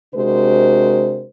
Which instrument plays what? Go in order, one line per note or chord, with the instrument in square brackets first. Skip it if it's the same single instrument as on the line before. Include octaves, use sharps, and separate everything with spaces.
[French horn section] C3 G#3 D4 F#4 A#4 C5